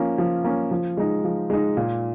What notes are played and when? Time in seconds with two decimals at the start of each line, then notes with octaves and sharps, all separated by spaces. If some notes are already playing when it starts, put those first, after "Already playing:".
Already playing: F3 A#3 C#4
0.18 F3
0.44 A#3 C#4
0.71 F3
0.97 G#3 D#4
1.24 F3
1.50 G#3 D#4
1.77 A#2